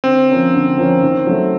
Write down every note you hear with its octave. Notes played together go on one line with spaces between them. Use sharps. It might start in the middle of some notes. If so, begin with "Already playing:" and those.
D3 C4
F3 A#3 C#4
D3
F3 A#3 C#4
D#3
F#3 A3